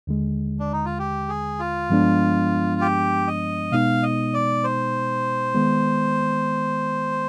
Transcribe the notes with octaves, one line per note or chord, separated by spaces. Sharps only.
D#2 D3 G#3
D4
D#4
F4
G4
G#4
F4
G2 F3 G#3 B3 D4
G4
D#5
B2 G#3 B3 D#4 F5
D#5
D5
C5
D#3 G#3 B3